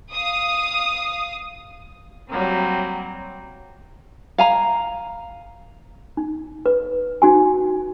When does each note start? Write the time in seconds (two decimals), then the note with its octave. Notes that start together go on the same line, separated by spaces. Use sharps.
0.14 F5 D#6
2.29 F#3 G3 A#3 C4
4.38 F5 G#5 A#5
6.17 D#4
6.66 B4
7.22 D#4 F#4 G#5